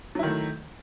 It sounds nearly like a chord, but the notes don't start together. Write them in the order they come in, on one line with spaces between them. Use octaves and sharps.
F#3 E4 D#3 A3